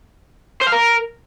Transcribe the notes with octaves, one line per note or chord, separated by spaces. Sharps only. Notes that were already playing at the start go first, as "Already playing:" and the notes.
C5
F5
A#4